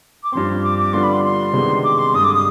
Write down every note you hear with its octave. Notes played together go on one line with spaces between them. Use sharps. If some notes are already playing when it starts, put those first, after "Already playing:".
D6
G2 F3 C4 C6
D6
D6
D3 G3 B3 D4 F4 C6
B5
C6
C6
C3 D#3 G#3 B3 D4
D6
C6
G2 D3 G#3 D#6
D6
D#6